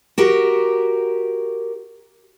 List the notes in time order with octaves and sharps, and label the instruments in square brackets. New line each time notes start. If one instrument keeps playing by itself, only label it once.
[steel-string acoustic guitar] F#4 G4 A#4